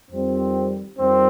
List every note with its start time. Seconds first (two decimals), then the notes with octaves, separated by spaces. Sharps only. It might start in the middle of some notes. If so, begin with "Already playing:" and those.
0.10 F2 D#3 G3 C4
0.97 F2 D#3 G3 C4